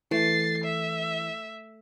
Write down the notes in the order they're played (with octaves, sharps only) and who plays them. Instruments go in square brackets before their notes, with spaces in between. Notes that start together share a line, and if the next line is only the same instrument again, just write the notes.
[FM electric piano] E3 [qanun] A3 [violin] A6 C7
[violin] E5